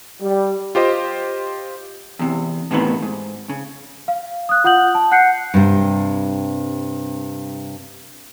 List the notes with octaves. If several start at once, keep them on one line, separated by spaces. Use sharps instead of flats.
G3
F4 G4 C5 D#5
E2 C3
A2 C3 D#3 E3 B3
G#2
C#3
F5
D#6 F#6
F4 F#5 D#6 G6 F#7
A5
F#5 F#6 G6 C7 C#7
G2 C3